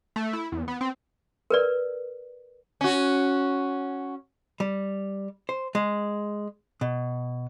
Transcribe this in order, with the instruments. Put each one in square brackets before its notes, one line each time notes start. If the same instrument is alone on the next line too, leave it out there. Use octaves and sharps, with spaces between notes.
[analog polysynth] A3
E4
E2
B3
C4
[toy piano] A#4 B4 D5
[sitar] C#4 F#4
[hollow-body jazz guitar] G3
C5
G#3
B2